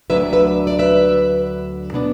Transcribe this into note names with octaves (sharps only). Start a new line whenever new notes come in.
D2 D3 F#3 D4 B4 E5
B4 E5
D5
B4 E5
B2 B3 D4